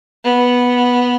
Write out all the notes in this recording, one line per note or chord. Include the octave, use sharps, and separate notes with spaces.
B3